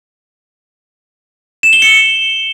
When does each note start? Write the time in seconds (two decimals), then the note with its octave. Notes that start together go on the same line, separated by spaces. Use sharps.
1.63 E7
1.73 G7
1.82 C#7